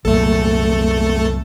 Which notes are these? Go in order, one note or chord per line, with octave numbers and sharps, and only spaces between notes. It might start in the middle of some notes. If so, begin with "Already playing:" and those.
C2 F#2 A#2 A3 A4